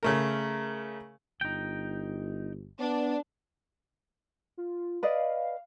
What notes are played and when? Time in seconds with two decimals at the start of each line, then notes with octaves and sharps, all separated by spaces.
0.03 C#3 A3 A#4
1.41 G1 D#4 G5
2.80 B3 D4
4.57 F4
5.03 B4 D5 D#5 F5